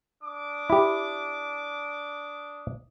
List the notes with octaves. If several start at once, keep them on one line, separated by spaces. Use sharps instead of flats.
D4 D6 D#6
E4 G4